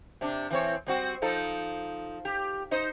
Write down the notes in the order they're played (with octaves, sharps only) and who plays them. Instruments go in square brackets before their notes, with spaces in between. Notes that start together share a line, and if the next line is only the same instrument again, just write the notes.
[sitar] C3 D4
E3 C4 C#5
G3 C4 F#4
F3 D#4 A4
G4
D#4 C5 D#5